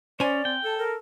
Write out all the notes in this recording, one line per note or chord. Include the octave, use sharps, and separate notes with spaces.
C#4 C5 D5 G#5
C4 G5
A4 A5
A#4